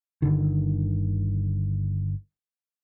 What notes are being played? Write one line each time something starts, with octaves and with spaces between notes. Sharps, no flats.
G1 D3 D#3